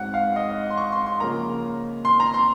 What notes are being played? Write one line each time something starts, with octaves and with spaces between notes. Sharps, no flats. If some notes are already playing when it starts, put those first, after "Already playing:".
Already playing: G#2 F#3 C4 F#5
F5
D#5
C6
C#6
C6
C6
C#3 F3 A#3 A#5
C6
A#5
C6